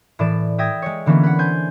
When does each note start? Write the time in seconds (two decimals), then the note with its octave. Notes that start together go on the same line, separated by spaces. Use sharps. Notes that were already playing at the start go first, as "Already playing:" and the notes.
0.19 A2 E3 D5 E7
0.58 E5 G5 D#6 G#6 A#6
0.82 G#3 C#5
1.06 D3 E3 A#3 B3 C#4
1.23 B4 F#5
1.39 C5 G#5 G6